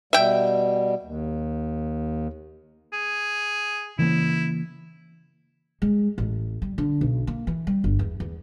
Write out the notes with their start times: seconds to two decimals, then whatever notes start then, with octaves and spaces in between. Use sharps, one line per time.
0.13 B2 G3 E5 G5
1.03 D#2
2.93 G#4
3.99 C#3 E3 A#3 E4
5.82 G#3
6.18 A1
6.62 G3
6.78 D3
7.01 B1
7.27 A#3
7.47 E3
7.67 G3
7.84 G1
7.99 E2
8.20 E2